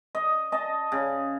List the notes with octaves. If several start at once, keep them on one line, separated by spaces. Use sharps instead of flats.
D#5
D#5 A5
C#3